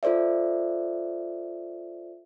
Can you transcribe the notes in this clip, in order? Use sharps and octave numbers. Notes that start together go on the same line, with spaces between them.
F4 A4 C5 D5 E5